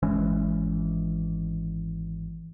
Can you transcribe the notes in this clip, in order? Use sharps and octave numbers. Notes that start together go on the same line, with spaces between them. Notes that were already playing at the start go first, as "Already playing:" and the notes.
G#1 E3 G#3 C#4